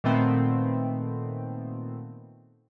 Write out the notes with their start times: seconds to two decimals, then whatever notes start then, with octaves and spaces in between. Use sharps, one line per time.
0.04 A#2 D#3 A3 B3 C4